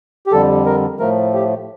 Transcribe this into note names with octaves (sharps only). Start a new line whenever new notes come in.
G4
F2 D3 G3 A4
A#4
A2 F3 A3 A#4
G4